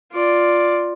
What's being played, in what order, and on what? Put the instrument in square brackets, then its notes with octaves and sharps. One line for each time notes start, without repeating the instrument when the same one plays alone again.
[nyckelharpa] F4 D5